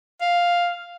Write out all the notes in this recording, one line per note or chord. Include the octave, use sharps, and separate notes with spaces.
F5